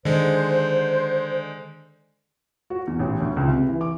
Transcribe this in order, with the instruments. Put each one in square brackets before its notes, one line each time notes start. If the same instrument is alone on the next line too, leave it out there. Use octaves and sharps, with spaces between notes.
[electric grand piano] D3 G#3 [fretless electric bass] D#3 [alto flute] C5
[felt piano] F#4
E2
A1
D2
C#2
C3
E3
D6